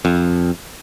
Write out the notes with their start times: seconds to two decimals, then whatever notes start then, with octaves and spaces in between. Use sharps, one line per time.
0.05 F2